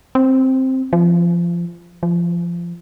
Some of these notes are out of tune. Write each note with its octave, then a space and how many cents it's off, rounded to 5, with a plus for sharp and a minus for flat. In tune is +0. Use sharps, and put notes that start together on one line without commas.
C4 +5
F3 -20
F3 -20